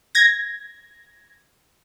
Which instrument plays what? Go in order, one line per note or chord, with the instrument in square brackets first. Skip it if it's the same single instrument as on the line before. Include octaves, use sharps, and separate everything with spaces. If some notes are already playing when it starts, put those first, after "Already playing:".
[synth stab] G#6 A#6